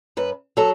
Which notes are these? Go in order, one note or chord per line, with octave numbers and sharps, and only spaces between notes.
F#2 B4
F#3 A4